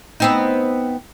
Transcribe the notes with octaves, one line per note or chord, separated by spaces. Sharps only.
B3 C4 D#4